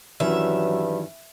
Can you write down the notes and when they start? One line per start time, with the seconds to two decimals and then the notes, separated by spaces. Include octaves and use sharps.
0.20 G2 D#3 E3 F#3 C#4 E5